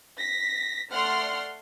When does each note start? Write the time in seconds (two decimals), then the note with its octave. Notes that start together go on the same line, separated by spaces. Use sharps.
0.19 A#6 B6
0.91 A3 D5 F#5 C6 F6